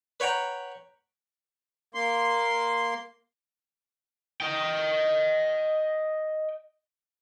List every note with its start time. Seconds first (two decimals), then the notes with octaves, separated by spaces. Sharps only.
0.20 B4 C#5 F#5 G5 A#5
1.95 A#3 C6
4.40 D#5 G5